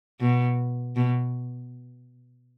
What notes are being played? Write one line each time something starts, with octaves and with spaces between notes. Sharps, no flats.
B2
B2